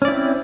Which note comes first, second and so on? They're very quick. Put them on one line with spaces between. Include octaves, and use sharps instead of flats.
C#4 D5 E4 C4